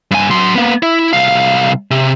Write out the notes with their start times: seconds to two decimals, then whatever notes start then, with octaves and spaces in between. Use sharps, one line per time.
0.11 G2 G#5
0.31 F#3 C6
0.55 A#3 B3
0.83 E4
1.13 C2 F5
1.91 C3